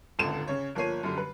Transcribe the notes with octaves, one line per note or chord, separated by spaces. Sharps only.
D#1 G#1 C#2 D3 E7
C#3 C#5
G1 F3 A#3 C#5 C7 D#7
F#2 D3 G3
B4